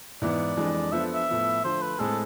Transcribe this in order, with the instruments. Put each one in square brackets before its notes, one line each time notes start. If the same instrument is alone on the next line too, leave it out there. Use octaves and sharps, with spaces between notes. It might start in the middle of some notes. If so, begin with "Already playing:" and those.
[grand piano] G#2 E3 B3 E4 [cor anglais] D5
[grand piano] F2 E3 G#3 D4
[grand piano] F3 B3 D4 A4 C5 [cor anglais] E5
[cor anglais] E5
[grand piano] A2 F3 B3
[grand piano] D3 F3 A3 [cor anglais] C5
[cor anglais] B4
[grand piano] A2 G#3 C4 G#4 [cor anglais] A4